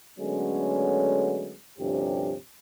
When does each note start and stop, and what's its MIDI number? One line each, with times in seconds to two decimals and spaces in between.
0.19 1.54 50
0.19 1.54 54
0.19 1.54 56
0.19 1.54 57
0.19 1.54 59
0.19 1.54 61
1.79 2.35 38
1.79 2.35 43
1.79 2.35 48
1.79 2.35 53
1.79 2.35 61
1.79 2.35 67